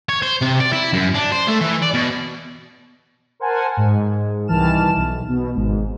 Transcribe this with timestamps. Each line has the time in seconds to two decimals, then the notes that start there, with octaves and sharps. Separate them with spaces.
0.09 C#5
0.22 C5
0.42 C3
0.60 D5
0.73 E4
0.93 F#2
1.14 D4
1.32 C5
1.48 A3
1.61 E3
1.82 D5
1.94 B2
3.40 A#4 C5 F#5 G#5 A5
3.77 G#2
4.48 C2 D#3 E3 A5 F6 E7
4.96 B1
5.29 B2
5.55 G#1 G#2